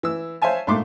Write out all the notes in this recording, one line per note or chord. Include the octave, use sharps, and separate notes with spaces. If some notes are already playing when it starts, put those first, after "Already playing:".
E3 E6
C5 C#5 E5 F5 G#5 A5
A#1 G#2 A3 C6 D6